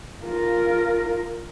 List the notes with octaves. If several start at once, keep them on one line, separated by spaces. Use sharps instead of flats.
F4 A#4